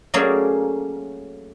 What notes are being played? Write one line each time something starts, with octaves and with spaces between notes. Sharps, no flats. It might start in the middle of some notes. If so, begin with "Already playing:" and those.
F#3 A3 A#3 C#4 G#4 D5